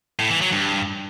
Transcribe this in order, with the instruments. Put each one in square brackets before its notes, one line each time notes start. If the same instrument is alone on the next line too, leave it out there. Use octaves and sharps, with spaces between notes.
[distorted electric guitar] A2
E3
F#3
G2